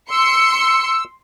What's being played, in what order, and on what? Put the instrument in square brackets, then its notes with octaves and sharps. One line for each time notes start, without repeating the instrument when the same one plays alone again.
[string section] C6 C#7 [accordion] E6